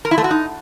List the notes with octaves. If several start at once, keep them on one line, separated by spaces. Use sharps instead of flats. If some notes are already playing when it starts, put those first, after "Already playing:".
A#4
E4
A3
F#4
D#4